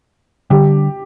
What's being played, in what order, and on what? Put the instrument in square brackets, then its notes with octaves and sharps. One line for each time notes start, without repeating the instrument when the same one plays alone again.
[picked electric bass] D3 G3 D4 [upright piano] G4